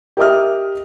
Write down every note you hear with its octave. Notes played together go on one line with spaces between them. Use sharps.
G4 A#4 D#5 E5 D#6 F6